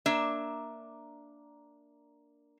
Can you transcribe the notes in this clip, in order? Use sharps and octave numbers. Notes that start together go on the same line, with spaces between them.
A#3 D4 E5